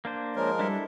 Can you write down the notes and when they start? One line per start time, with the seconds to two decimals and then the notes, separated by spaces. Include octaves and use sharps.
0.05 A#3 D4 C5
0.36 F3 G#3 A#4 C#5
0.59 G3 D4 E4 A4